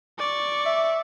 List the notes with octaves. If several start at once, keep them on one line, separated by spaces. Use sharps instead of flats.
D5 C#6
E5